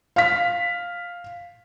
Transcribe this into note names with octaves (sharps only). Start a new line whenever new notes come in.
F5 B6